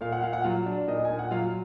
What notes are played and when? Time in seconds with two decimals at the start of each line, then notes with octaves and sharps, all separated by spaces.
0.01 A#2 F5
0.12 F#5
0.23 A#2 F5
0.33 F#5
0.44 F#3 F4 F5
0.66 D4
0.88 A#2 D#4 D#5
1.05 A#2 G#5
1.19 F#5
1.31 F#3 F4 F5